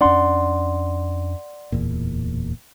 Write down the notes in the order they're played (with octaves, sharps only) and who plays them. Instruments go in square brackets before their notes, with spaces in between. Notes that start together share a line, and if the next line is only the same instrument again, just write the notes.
[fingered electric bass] F2 C#4 D4 [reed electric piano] D5 F#5 C6
[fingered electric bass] D1 E2 A#2